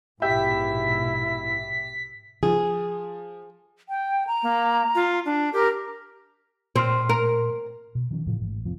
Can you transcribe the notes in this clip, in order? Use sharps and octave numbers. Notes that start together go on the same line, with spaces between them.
A#1 G#2 B2 E4 G4 E5 G6 B6
F3 G#4
G5
A#5
A#3
F4
D4
G4 A#4
A#2 C4 C6 F6
A#4
B2
D#3 F3 C#4
A2 C#3 E3 F3
A1 G#2
F1 F3 C4